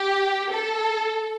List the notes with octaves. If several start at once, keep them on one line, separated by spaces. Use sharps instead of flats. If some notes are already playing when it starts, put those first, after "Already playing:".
Already playing: G4
A4